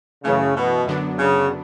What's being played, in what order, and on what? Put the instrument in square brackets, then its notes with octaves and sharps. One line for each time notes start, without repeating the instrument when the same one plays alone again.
[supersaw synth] F#2 E3 A3 [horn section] C#3
[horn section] B2
[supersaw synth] F#2 D3 F#3 B3 D4
[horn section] C#3